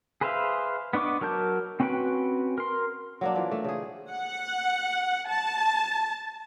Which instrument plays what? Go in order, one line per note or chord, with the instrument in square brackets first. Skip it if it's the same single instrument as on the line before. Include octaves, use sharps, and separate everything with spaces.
[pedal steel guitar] G#4 B4 C5 E5 F5
B3 D4 D#5 C#6 D6
F#3 A#4 A5 G6
C4 C#4 F#4 B4 G5
A#4 C6
[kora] F#3 A#3 D4
E3 F3 D5
A3
C#3 G#4
[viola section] F#5
A5